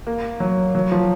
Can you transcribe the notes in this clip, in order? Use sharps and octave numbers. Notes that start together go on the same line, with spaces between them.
A#3
F#3
F#3
F3